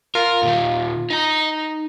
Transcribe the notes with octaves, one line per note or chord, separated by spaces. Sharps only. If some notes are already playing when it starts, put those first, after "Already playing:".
F4 A#4
A#2 D#3
D#4 A#5